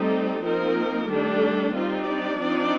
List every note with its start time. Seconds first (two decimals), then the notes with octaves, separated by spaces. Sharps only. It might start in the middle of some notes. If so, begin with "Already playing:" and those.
Already playing: G3 A3 C4 D#4 A4
0.43 F3 A#3 C4 D#4 A#4
1.08 D#3 G3 A3 D4 A4
1.74 G3 C4 D#4 F4
2.07 D4 D5
2.40 F3 C4 D#4